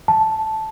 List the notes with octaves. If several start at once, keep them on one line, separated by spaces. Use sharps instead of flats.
A5